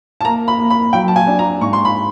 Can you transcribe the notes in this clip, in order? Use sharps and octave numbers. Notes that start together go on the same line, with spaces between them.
A5
A#3 A#5
B5
A#3
B5
F#3 G5
A5
G#5
D4
A#5
G#2 C#6
C6
B5